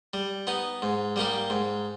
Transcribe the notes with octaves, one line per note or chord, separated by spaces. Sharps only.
G3
B3 D#4
G#2
G3 A#3 D#4 G4
G#2